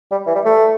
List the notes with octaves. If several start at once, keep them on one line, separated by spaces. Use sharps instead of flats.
G3
E3
G3
A3